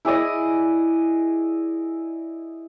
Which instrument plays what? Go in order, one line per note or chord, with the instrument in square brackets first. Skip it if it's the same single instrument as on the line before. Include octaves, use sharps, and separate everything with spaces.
[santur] E4 G#4 D5 D#5